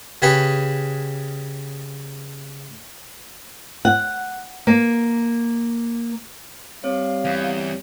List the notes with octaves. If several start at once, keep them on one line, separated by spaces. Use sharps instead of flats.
C#3 G4 G#4 B4 B5 C#6
F#5
A#3
G3 C4 C#5 F5
E2